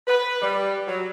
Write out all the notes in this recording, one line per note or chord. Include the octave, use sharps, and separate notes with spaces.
B4
G3
F#3